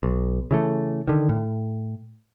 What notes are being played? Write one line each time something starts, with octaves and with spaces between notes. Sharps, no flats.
B1
C#3 E3 A3
D3 D#3
A2